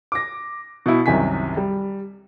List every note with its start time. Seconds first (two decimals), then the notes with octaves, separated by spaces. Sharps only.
0.12 D6 A#6
0.86 B2 E4
1.06 C2 F#2 C3 D#3 G#5 B6
1.57 G3